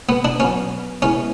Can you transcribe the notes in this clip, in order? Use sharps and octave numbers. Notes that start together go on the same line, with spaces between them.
B3
D4
B2 F#3 B3 C#4
B2 G#3 B3 C#4 E4